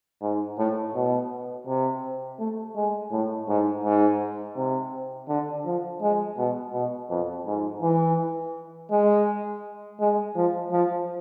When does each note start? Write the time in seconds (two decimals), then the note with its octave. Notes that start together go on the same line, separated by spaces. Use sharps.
0.22 G#2
0.58 A2
0.95 B2
1.67 C3
2.39 A3
2.76 G#3
3.12 A2
3.48 G#2
3.84 G#2
4.56 C3
5.28 D3
5.66 F3
6.02 G#3
6.38 B2
6.73 B2
7.10 F2
7.46 G#2
7.82 E3
8.91 G#3
10.00 G#3
10.36 F3
10.72 F3